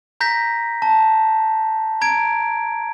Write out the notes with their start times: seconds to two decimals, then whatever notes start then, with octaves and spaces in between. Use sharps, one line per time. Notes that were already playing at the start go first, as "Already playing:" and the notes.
0.21 A#5 G6 A#6 B6
0.82 A5
2.01 A#5 G#6 D7